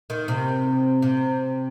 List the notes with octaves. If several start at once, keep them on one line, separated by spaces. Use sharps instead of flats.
D#3
C3
C3